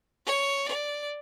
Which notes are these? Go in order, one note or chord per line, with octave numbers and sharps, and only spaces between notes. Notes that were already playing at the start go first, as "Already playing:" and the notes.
C#5
D5